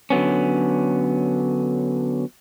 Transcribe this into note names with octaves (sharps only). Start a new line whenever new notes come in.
D3 F#3 B3 C#4